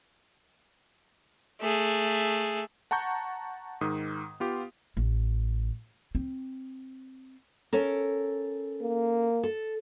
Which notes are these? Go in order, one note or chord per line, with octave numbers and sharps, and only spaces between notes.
A3 G#4
F#5 A5 A#5 C#6 G6
G#2 D#3 D#6
B3 F4 G4
A1
C4
C#4 A4 A#4
A#3
A4